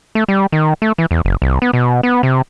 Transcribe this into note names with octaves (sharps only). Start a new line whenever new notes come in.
A3
G3
D#3
A3
E3
E2
F#1
C2
B3
B2
B3
C3